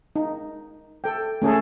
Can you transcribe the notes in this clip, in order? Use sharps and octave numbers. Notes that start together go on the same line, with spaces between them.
D#4
A4 G5
A3 C#4 G#4 A4